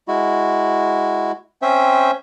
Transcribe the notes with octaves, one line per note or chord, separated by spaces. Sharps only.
G#3 E4 F#4
C4 C#4 C5 E5 G5